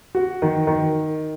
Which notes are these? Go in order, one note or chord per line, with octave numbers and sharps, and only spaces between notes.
F#4
D#3
D#3